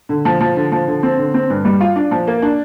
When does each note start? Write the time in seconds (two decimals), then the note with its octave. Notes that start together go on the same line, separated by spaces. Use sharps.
0.09 D3
0.25 F3
0.40 F3
0.56 D3
0.72 F3
0.87 D3
1.03 C4
1.18 D3
1.34 C4
1.50 G2
1.65 G3
1.81 F4
1.96 D4
2.11 F3
2.27 A#3
2.42 D4